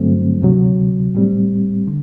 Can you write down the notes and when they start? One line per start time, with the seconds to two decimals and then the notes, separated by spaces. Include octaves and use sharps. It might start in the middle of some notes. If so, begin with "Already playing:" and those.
Already playing: G2 D3 F#3 A3 C4
0.42 D2 C3 F#3
1.15 A2 G3 C4
1.87 D3